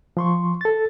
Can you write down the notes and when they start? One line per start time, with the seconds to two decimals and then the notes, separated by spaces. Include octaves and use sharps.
0.17 F3 C6 C#6
0.61 A4 A6